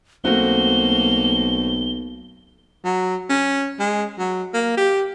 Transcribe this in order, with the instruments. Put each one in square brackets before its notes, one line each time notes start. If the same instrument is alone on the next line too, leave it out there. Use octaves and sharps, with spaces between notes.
[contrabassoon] B1 [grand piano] A3 C4 F#4 [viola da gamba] A#3 [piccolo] G7
[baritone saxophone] F#3
C#4
G#3
F#3
A#3
G4